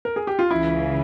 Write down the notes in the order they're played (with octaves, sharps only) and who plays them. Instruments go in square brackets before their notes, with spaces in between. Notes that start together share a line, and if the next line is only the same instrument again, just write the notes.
[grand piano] A#4
G#4
G4
F4
[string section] C#2 C#3 E3 [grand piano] E4